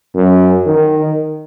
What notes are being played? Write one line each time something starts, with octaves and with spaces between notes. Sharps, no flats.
F#2
D#3